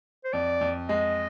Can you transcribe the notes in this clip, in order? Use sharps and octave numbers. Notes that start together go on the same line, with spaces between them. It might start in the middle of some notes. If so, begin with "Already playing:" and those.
C5
F2 D5
F2
G#3 D#5